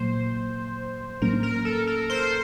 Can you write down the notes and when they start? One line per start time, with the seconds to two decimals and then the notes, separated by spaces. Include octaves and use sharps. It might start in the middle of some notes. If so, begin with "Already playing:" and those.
Already playing: A#2 F#3 A#3 C5
1.22 A2 F#3 A#3 C#4 A#4
1.43 A#4
1.65 A4
1.87 A#4
2.10 C5